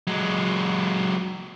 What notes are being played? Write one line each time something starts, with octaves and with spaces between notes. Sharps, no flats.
F#3 G#3